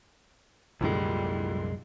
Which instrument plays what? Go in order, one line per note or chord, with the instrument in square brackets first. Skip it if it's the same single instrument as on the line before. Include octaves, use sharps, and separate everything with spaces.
[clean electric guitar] C2 F#2 G#3 [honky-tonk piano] A#2 D3 E3 [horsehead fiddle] G3